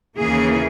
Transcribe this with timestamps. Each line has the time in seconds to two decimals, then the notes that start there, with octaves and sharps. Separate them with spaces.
0.18 D#2 C#3 E3 A#3 G#4